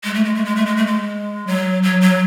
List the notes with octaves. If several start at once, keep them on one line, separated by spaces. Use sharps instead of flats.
G#3
A3
G#3
A3
G#3
A3
G#3
A3
G#3
F#3
F#3
F#3